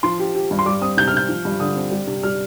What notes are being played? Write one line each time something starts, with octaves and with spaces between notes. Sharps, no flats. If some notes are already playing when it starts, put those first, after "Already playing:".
F3 C6
G4
G4
G2
C6
G3 D6
C4 D#6
C3 G6
F6
C3 G6
F3
G2
D3 D#6
C4
G3
C3
G3 F6